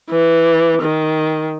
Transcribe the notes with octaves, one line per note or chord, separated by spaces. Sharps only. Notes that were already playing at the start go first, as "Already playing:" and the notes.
E3
D#3